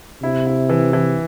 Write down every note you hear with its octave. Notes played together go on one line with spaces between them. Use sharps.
C3 E4
E4
E3
E3